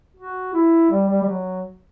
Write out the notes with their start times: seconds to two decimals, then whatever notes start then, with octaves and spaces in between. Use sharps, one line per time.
0.17 F#4
0.54 E4
0.91 G3
1.08 G3
1.21 G3
1.26 F#3